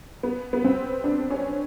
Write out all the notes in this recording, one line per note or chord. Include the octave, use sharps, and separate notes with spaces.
B3
B3
C4
D4
C#4